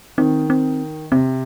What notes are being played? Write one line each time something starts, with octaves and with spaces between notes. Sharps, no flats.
D#3 C4
C4
C3 C4